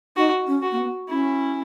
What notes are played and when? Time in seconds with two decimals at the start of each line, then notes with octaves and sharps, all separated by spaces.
0.16 D#4 F#4
0.47 C#4
0.62 F#4
0.71 A#3
0.77 B3
1.09 C#4 E4